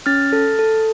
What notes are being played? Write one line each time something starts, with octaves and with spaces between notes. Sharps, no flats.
C#4 F6 A6
A4
A4